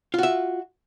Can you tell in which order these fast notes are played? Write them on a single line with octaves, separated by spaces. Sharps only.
F4 F#4 E5